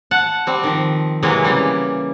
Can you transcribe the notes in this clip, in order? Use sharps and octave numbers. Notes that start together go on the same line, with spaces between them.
F#5 A5
G3 C4
D#3 F3
C3 E3 F#3 G#3 A#3
C#3 E3 G3